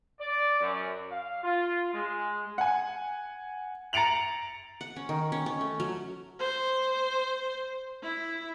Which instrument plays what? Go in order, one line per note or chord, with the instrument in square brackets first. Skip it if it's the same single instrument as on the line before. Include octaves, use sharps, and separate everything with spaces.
[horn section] D5
F#2
F5
F4
G#3
[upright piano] F#5 G#5
A#5 A6 C#7 D7 F7 F#7
[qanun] F#5
C#4
D#3
C#4
C#4
A3
F#3
[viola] C5
E4